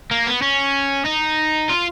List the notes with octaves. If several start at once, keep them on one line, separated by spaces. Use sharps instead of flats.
A#3
B3
C#4
D#4
F4